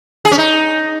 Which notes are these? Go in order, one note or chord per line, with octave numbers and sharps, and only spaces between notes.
G#4
C#4
D#4